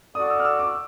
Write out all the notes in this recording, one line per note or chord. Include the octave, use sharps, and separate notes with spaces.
F#4 A4 D5 D#6
E6
F6
E6
D6